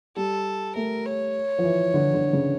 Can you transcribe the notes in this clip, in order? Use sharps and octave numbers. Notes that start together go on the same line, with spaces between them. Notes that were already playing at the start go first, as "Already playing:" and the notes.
G3 A4
A3 A#4
C#5
F3
E3
D3
D3
C#3